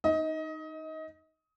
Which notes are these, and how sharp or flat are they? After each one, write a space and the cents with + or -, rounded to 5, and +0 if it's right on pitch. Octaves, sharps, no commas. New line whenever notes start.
D#4 +0 D#5 +25